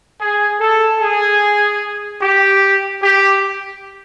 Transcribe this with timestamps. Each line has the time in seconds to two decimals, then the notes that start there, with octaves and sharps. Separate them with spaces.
0.20 G#4
0.60 A4
1.01 G#4
2.21 G4
3.02 G4